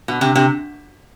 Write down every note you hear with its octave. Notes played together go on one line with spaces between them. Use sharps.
B2
C3
C3